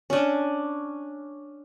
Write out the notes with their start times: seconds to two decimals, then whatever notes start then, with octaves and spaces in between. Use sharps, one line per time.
0.10 C#4 D4